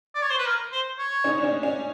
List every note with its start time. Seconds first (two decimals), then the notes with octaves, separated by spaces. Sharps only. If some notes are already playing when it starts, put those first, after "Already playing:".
0.15 D5
0.22 C#5
0.30 C5
0.38 B4
0.46 A#4
0.72 C5
0.99 C#5
1.24 C#4 D#4
1.38 D4
1.44 C#4
1.63 C#4